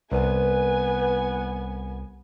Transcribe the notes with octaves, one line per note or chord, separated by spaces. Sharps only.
C2 B3 B4 G#5